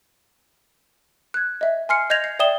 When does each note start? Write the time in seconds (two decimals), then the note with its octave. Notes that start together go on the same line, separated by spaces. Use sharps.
1.34 F#6 G#6
1.61 D#5 E5
1.89 G#5 C6 F6 C7 C#7
2.10 D#5 G6 G#6 A#6 F7
2.24 C7
2.39 D5 E5 G5 D#6 E7 G7